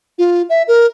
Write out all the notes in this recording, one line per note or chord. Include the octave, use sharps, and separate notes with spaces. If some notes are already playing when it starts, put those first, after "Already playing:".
F4
E5
A#4